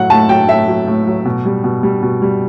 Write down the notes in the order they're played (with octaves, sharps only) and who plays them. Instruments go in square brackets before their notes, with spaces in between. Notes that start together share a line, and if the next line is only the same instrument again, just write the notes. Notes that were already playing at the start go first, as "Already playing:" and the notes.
Already playing: [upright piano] A2 F#3 F#5
A2 A5
F#3 G5
A2 E5
F#3
A2
F#3
B2
G3
B2
G3
B2
G3